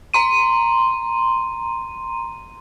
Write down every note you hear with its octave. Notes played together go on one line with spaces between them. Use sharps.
A#5 C6 D#7